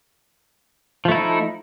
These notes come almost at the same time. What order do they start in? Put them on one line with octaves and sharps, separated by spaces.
F3 A3 E4 D#4